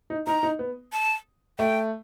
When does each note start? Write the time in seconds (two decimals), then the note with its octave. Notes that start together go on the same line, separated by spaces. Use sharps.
0.10 D#4
0.27 D#4 A#5
0.43 D#4
0.59 B3
0.93 A5
1.59 A3 G5